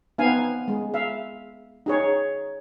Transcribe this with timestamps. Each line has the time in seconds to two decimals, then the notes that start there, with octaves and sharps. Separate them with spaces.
0.18 B3 C4 D#4 F5 G#5
0.68 G#3
0.94 E5 F5
1.86 D#4 G#4 C#5